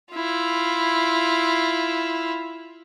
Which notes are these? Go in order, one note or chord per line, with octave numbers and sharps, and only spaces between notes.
E4 F4